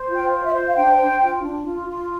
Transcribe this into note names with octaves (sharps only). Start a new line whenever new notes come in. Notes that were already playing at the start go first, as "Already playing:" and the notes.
Already playing: C5
F4
G5
C5
E5
C5
F5
D4 G5
C5
F4
D4
F4
F4